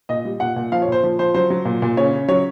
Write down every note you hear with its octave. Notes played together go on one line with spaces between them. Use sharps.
A#2 D#5
G3
A#2 F#5
A#2
F3 F5
C#5
A#2 C5
F3
F3 C5
F#3 C5
F#3
A#2
A#2
C#3 C#5
C#3
F#3 C#5